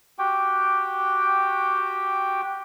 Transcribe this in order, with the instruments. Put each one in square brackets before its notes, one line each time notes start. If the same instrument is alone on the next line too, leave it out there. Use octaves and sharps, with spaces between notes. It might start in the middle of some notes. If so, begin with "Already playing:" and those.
[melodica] F#4 G4 G5